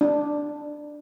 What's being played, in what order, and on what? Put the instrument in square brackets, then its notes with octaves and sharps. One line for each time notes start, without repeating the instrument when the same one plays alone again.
[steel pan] D4